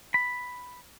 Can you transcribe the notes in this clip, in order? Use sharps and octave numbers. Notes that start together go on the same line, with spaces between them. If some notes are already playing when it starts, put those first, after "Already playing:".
B5